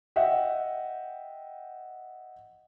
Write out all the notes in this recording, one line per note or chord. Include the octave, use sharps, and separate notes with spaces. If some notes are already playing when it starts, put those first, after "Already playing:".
D#5 E5 F#5 G5